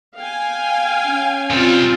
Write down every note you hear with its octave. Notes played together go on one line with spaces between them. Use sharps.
F5 G5 G#5
C#4
C3 G3 C4 F4